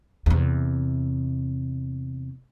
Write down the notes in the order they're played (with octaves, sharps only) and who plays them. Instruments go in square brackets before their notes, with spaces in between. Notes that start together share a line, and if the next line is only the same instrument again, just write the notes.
[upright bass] E2 C3